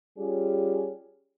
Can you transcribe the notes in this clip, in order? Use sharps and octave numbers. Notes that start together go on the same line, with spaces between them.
G3 C#4 F4 G4 G#4